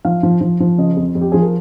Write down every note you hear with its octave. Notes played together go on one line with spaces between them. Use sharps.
F3 F5
F3
F3
F3
C#3 D#5
F2
F2
G4
F3 G#4
A#4